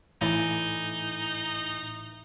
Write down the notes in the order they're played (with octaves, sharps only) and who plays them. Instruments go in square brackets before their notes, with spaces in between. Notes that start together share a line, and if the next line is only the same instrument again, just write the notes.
[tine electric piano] A2 G#5 [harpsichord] E3 D5 [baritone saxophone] D#4